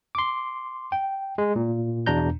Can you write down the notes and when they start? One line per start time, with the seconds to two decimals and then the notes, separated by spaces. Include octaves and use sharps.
0.15 C6 D6
0.92 G5
1.38 G#3
1.56 A#2
2.06 E2 B2 D4 A#5 G6